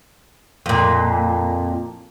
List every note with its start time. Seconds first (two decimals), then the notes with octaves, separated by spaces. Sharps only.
0.66 F2 A#2